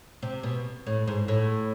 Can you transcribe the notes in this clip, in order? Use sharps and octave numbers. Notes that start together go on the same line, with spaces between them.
C3
B2
A2
G#2
A2